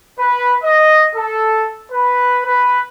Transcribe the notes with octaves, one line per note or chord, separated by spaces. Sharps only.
B4
D#5
A4
B4
B4